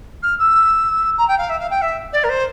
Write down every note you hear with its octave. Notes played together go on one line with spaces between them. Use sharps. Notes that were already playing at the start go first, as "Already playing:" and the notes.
F6
E6
A#5
G5
F5
E5
F5
G5
E5
D5
A#4
C5